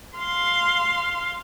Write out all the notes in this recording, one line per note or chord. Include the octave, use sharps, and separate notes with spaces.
F5 C6